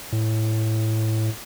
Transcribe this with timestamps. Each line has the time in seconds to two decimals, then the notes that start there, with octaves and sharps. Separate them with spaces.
0.12 A2